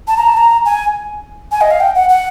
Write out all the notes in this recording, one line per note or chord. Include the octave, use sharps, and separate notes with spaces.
A5
A#5
A5
A#5
G#5
G#5
D#5
F5
G5
F#5
F#5